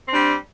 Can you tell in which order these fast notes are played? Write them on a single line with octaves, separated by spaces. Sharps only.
C4 D4 G3